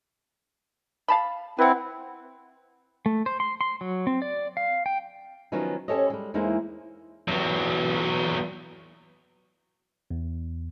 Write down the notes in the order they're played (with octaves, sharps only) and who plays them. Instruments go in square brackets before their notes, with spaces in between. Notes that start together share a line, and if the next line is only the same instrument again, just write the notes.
[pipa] F5 A5 B5
[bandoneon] C4 E4 [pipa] B4 F#5
[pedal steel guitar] A3
C5
C6
C6
F#3
C4
D5
F5
G5
[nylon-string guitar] D#3 F3 F#3 B3 C#4 D#4
C#4 G4 A4 C5 C#5 D#5
G3 G#3
E2 G#3 A#3 D#4 E4 C5
[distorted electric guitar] E2 F#3
[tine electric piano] E2